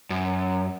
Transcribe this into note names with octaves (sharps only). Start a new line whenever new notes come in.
F#2